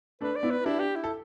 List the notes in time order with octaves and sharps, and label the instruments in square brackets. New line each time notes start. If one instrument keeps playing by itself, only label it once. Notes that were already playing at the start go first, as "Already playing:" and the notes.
[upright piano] A3 D4 [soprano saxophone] B4
[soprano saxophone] D5
[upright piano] B3 E4
[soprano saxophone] B4
[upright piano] D4 G4 [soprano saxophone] E4
[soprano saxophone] G4
E4
[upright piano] A4